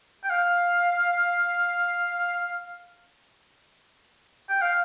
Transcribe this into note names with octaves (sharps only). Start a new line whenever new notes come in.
G5
F5
G5
F5